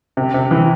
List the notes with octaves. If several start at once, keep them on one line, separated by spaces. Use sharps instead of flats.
C3
C3
E3